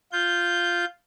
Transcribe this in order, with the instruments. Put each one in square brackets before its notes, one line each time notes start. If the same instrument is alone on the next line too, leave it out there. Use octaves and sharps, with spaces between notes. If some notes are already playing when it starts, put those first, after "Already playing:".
[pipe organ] F4 G6